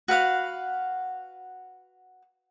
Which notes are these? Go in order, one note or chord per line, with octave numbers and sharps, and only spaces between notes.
F#4 B4 F5 F#5